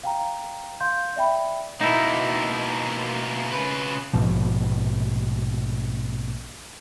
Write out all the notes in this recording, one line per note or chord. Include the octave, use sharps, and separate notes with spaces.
F5 G5 A#5
F5 C6 G6
D5 E5 G5 B5
B2 A#3 D#4 E4
C#3 B4
A#1 G#2 B2 F3